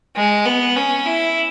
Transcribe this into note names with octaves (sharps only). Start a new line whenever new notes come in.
G#3
B3
C#4
E4